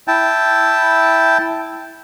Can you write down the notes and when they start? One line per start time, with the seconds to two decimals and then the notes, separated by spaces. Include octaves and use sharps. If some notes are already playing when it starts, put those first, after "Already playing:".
0.08 E4 G5 A5